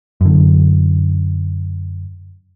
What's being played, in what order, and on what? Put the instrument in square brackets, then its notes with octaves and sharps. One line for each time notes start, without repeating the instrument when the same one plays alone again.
[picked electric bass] F#2 D3